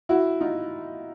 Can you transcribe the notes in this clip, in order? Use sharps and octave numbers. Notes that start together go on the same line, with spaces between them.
E4 F#4
D#4 F4